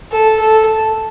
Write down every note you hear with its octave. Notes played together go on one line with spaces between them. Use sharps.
A4
A4